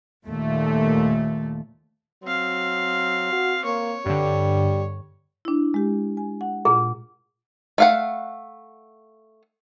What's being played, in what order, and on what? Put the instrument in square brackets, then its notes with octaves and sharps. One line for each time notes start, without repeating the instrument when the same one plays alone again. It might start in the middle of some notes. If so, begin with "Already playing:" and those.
[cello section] D#2 A#2 A3
[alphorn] F#3 [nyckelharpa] C4 F5
[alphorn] F#4
[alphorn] A#3 [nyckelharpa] C#5
[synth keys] G2 D3 [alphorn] G3
[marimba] D4 E4
G#3 G4
G#5
F#5
[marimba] A#2 F4 F#5 [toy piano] G#4
[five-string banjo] A3 F5 F#5